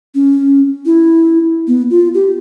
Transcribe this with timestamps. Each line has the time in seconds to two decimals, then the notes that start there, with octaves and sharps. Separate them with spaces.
0.15 C#4
0.86 E4
1.68 B3
1.90 F4
2.14 G4